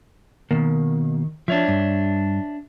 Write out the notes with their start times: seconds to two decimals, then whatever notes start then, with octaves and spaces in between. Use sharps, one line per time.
0.51 B2 D#3 A#3
1.48 F3 D4 C#5 E5
1.68 G2